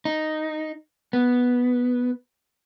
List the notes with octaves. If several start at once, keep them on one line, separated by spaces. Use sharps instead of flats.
D#4
B3